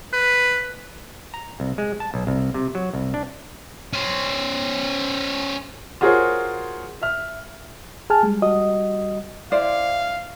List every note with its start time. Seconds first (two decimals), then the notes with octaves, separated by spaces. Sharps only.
0.13 B4
1.34 A#5
1.60 C2
1.78 G#3
2.00 A5
2.14 B1
2.27 C2
2.54 C3
2.75 F#3
2.93 C2
3.14 D4
3.93 C#4 C5
6.01 F4 F#4 G#4 A#4 C5 C#5
7.02 E5 F6
8.10 G#4 G#5 A5 F6
8.23 G3 G#3
8.42 G3 F#4 D#5 D#6
9.52 E4 C5 D5 F5